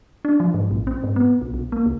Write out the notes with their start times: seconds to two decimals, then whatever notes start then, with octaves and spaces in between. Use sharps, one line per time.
0.25 D4
0.40 F3
0.54 G#2
0.71 A#1
0.87 C4
1.03 G#2
1.16 B3
1.41 B1
1.54 B1
1.72 A#3
1.86 C#2